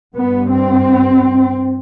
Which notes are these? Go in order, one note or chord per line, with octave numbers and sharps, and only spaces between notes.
G2 B3
C4